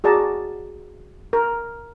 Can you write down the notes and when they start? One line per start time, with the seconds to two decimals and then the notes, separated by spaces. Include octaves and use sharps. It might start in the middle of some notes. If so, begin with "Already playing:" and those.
0.04 F#4 G#4 D5 A5 A#5
1.33 A#4